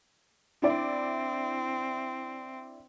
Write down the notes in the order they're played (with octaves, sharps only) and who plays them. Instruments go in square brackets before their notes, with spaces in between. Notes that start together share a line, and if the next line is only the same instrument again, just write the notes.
[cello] C4 [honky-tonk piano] D4 E4 D5